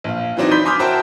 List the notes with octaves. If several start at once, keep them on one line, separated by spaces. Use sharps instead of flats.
A#1 F5
E3 F#3 C4 D4 D#4
B5 C6 G6 B6 G7
G#5 C6 D6 D#6 F6 G6
F#4 A#4 C5 E5 G5 A5